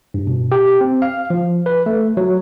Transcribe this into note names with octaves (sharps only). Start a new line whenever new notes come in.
G2
B2
G4
C4
F5
F3
B4
A3
F#3